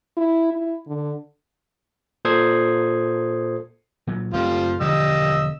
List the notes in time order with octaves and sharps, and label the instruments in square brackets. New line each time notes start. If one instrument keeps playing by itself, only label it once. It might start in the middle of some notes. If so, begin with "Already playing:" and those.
[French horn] E4
E4
D3
[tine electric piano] A#2 A4 C5 D#6 G#6 C7
[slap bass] A#2 F#3
[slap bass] F#1 A3 C4 [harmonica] F3 G3 F4
[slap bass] E1 D3 F3 [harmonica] G3 D#5 E6